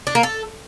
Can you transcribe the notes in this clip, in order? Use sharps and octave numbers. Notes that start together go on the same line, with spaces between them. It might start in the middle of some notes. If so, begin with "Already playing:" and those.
D4
A#3
A4